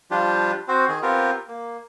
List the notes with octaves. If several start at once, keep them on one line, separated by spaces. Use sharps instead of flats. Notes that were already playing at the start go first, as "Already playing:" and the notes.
F3 G3 D4 F4 G4
C4 F#4 C5
D#3 G#4
B3 C4 F4 G4 A#4
A#3